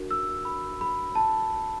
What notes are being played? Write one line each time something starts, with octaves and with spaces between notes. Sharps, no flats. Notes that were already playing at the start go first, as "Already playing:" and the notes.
Already playing: D4 F#4 A#4
E6
B5
B5
A5